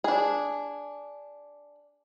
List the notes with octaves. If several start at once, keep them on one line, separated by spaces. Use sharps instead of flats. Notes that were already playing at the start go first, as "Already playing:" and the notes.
D4 G#4